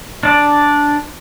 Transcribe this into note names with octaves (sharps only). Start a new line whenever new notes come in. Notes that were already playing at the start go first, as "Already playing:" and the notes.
D4 D5